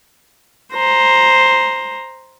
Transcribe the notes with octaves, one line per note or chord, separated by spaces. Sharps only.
C5 A#5